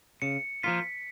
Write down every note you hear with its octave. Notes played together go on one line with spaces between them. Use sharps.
C#3 C#7
F3 A#3 F4 B6